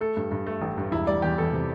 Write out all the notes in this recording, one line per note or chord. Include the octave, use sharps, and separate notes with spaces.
A3 A4
G2
G2
A3
A1
G2
E1 E4
G3 D5
E2 G4
E2 A4
C3